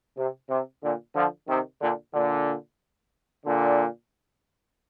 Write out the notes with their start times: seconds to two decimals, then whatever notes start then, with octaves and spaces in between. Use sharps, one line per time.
0.18 C3
0.50 C3
0.83 A#2 D3
1.16 D3 F3
1.49 C3 D#3
1.81 A#2 D3
2.14 A#2 D3
3.46 A#2 D3